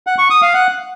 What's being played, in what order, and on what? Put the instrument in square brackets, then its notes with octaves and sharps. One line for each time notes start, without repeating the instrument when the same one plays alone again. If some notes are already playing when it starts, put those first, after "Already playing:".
[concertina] F#5
C#6
D#6
F5
F#5